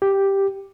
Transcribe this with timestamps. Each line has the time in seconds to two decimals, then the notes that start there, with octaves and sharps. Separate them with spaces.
0.02 G4